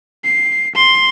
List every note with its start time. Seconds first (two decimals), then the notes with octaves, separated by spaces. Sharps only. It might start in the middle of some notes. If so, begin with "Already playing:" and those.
0.24 C7
0.75 C6